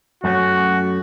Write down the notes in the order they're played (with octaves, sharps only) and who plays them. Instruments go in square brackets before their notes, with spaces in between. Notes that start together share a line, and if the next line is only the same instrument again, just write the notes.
[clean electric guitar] F#2 A3 C#4 [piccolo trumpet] F#4